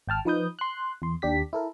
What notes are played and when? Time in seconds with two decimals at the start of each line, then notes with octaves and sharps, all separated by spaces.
0.08 G#1 G5 A5 F6
0.25 F3 D#4 B4 D#6 G6
0.59 C6 F#6
1.02 E2 C6
1.22 D#2 D4 G4 B6
1.53 E4 A4 A#4